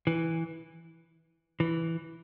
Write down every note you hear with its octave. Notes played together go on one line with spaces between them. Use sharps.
E3
E3